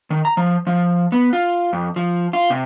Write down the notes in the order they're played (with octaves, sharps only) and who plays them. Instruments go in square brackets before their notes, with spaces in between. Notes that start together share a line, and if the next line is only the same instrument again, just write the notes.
[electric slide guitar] D#3
A#5
F3
F3
B3
F4
F2
F3
F4
C3